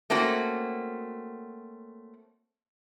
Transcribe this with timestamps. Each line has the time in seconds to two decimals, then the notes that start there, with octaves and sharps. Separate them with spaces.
0.10 A3 A#3 C4 C#4 F#4